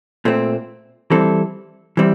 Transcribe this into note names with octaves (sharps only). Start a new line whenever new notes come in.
A#2 A3 C4
E3 G3 C4 E4 A4
E3 G3 C4 E4